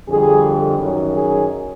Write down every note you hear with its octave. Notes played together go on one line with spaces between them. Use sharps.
F2 D3 G3 G#4
F#2 D#3 F#3
G#4